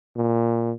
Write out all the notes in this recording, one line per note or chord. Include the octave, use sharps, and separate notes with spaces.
A#2